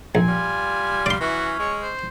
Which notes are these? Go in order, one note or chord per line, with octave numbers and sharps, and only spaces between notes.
A#1 C4 G#5
G3 F4
D5 F5 C6
E3 C#4 F#4
G#3 C#5
C5